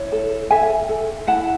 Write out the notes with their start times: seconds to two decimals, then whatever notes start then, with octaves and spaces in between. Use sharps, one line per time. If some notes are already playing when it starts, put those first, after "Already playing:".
Already playing: E4 C#5
0.12 A4
0.51 A4 E5 G#5
0.89 A4
1.27 E4 F#5 A5